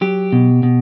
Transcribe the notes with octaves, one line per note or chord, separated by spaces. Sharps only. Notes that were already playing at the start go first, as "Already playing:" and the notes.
F#3 G4
B2
B2